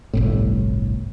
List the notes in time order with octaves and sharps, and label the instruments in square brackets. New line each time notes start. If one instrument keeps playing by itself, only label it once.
[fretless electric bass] G1 C2 A2